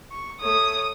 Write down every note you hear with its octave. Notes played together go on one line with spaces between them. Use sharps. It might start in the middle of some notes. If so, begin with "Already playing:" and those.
C#6
A3 C#5 D#6